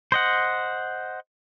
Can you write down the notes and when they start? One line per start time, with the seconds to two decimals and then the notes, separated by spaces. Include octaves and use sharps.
0.12 C5 D#5 F#5